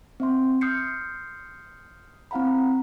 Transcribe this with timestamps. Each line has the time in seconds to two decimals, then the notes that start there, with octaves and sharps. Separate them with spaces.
0.20 C4 E5 C6
0.61 C6 D#6 F6 G6 C7 C#7
2.31 C4 E4 F5 F#5 A#5 B5